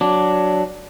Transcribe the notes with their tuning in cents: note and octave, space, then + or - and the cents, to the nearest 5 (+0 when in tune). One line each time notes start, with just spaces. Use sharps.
F#3 +5 D4 +0